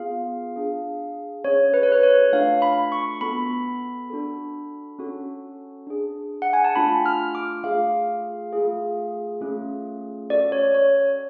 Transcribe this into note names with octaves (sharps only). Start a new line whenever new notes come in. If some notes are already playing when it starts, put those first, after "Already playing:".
Already playing: B3 F4 G#4 F5
D4 G#4
C#4 G#4 C#5
B4
C#5
B4
C#5
A3 D4 F4 A4 F5
B5
C#6
B3 F#4 A4 B5
D4 F#4 A4
C#4 F#4 A4
D4 G#4
F#5
G#5
A5
A3 D4 F4 B5
F6
D6
A3 F4 G#4 F5
A3 F4 G#4
A3 C#4 F4 G#4
C#4 F#4 A4 D5
C#5
C#5